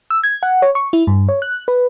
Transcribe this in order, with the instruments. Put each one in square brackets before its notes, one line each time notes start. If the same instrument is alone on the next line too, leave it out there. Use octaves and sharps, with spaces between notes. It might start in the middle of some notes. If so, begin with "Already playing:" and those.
[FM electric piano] E6
G#6
F#5
C#5
C#6
E4
G2
C#5
F#6
B4